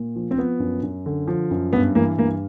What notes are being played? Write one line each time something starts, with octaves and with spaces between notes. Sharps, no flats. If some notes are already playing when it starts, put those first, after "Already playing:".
Already playing: A#2
F3
C4
F3 B3
F#2
F#2
D3
F3
F#2
G2 B3
E3 A#3
G2 A#3